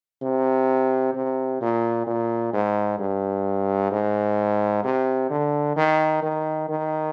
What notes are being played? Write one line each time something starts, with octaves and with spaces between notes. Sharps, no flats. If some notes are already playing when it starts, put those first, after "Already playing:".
C3
C3
A#2
A#2
G#2
G2
G#2
C3
D3
D#3
D#3
D#3